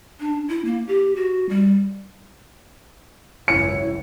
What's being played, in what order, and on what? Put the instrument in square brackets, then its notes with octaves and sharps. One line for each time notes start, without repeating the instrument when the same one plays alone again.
[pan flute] D4
E4
A#3
G4
F#4
G3
[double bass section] G#1 C#2 F#2 [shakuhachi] E4 [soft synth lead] C#5 [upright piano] C#7